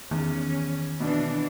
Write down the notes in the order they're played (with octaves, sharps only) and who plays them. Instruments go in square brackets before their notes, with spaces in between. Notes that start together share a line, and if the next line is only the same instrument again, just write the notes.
[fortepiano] E2 [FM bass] D#3 [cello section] C#4
[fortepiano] B2 [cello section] E3 D4